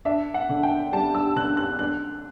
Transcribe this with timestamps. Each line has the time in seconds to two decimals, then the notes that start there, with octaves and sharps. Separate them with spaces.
0.05 D4 E5
0.34 F#5
0.49 D3
0.63 G5
0.93 G3 A5
1.15 E6
1.36 D3 F#6
1.57 F#6
1.79 D4 F#6